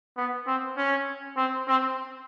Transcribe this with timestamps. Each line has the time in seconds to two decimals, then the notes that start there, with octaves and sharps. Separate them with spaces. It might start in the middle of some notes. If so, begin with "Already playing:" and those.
0.17 B3
0.47 C4
0.77 C#4
1.37 C4
1.68 C4